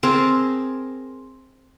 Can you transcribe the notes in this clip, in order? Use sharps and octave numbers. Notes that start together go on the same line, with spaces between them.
C4 G#4 A#4 A5